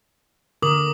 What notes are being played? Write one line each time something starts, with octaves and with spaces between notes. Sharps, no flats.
D3 A#4 D6 D#6 F#7